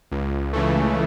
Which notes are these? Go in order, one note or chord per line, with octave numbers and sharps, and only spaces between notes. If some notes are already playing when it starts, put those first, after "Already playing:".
C#2
C#3 E3 A3